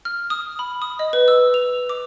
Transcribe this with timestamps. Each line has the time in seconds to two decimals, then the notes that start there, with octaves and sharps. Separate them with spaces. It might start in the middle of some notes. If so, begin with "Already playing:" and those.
0.05 F6
0.30 D#6
0.59 B5
0.82 D#6
0.99 D#5
1.13 B4
1.28 E6
1.54 F7
1.89 D6